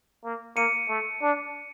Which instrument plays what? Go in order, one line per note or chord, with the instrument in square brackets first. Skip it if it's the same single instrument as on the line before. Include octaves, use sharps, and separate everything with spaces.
[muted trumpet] A#3
[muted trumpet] A#3 [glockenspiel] C#7 D#7
[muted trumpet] A3
D4